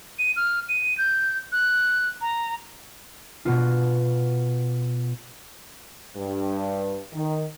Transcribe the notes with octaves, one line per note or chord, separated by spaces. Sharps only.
D#7
F6
D#7
G6
F#6
A#5
B2 B3 F4
G2
D#3